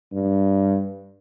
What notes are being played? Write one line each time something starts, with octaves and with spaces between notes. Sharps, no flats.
G2